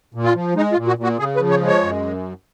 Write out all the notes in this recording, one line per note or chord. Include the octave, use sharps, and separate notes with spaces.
A#2
F4
F3
G#3 D#4
F4
A#2
F#4
A#2
F#4
C#3 G#4
B4
F3
C#5
G#3
C#5
F#2